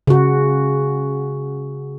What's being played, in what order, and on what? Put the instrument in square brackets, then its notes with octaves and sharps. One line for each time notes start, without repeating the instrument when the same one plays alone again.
[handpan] C#3 F#4